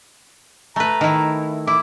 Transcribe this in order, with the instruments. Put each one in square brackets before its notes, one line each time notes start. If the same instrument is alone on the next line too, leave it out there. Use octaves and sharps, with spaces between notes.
[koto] A3 B4 [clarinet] A#5
[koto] D#3 E4
[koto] E4 [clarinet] D6